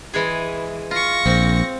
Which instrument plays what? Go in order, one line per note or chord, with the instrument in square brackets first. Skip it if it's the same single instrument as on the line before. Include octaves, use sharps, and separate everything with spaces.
[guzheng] E3 G#3 G#4
[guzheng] F4 [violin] C#6 A#6
[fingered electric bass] A#1 [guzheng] C4